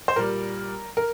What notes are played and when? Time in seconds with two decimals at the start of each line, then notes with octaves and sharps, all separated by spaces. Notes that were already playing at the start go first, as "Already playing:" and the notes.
0.08 C5
0.16 A#2 G3 A#4
0.97 A#4